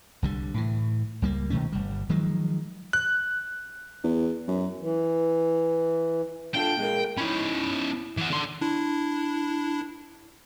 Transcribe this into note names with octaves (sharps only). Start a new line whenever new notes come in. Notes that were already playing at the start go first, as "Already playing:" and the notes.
C2 D3 G3
A2 E3
C#2 G3 A#3
B2 D#3 A3 C#4
G1 G3
D#3 F3 F#3 G#3
F#6
E2
F#2
E3
D4 F4 A4 G5
A#2 G#3 A#3
C#4 D#4 E4 B5
E3 F#5
D3 C6
D4 E4